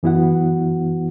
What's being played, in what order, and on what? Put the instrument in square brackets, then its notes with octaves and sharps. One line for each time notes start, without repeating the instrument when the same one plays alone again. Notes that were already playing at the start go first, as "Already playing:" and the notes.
[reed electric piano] F#2 E3 B3 E4 F#4 F#5